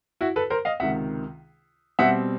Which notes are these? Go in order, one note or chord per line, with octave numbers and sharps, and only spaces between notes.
E4 F#4
A4 B4
A#4 C5
D#5 F5
C#2 C3 D#3 E5 F#5
B2 G3 C4 E5 F#5